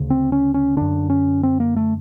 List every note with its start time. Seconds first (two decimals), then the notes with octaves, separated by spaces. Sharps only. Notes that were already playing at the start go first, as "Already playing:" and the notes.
Already playing: D2 C#3
0.10 C4
0.32 C#4
0.54 C#4
0.76 F#2 D3 D4
1.10 C#4
1.43 C4
1.60 A#3
1.76 A3